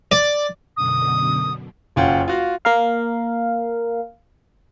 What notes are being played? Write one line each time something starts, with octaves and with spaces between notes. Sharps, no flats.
D5
F#2 B2 D3 D#6
F#1 C#4 F4 F#5 G5
F4 F#4 F5
A#3 A#4 F5